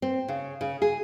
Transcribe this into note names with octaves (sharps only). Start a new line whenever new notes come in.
C4
C#3
C#3
G#4